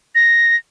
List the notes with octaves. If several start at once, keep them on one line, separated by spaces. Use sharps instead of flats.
A#6